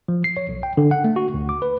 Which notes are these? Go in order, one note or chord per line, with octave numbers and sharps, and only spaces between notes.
F3
C7
C#5
B1
G5
D3
F#5
A3
F#4
D2
D6
B4